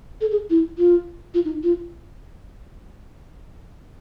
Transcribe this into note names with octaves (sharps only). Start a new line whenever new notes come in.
A4
G#4
E4
F4
F4
D#4
F4